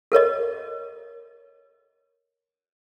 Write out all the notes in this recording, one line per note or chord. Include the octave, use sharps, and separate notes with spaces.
A4 A#4 C#5 D#5